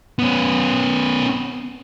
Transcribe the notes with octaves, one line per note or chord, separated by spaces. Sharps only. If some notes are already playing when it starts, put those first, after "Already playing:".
B3 C#4